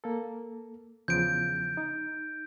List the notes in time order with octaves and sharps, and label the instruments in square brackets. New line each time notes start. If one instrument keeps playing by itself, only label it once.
[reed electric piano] A#3 A4
[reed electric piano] E2 C#3 F3 [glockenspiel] G6 D7
[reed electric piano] D#4